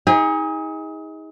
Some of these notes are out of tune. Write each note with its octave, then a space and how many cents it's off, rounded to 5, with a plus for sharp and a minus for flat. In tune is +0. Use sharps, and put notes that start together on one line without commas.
D#4 +35 G#4 -25